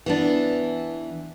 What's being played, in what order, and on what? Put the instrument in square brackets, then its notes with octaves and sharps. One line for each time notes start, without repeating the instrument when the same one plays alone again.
[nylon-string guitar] E3 B3 D4